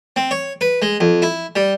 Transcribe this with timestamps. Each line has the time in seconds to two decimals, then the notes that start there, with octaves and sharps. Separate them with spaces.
0.16 C4
0.31 C#5
0.61 B4
0.82 G#3
1.00 F2
1.22 E4
1.56 G3